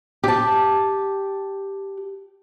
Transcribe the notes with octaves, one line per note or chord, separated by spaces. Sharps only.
G4 A5